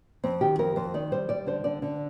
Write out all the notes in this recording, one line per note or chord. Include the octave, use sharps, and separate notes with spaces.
F2 C4
D#3 G4
F2 A#4
F2 C5
D#3 D5
G3 C5
G3 D5
D3 C5
D3 D5
D3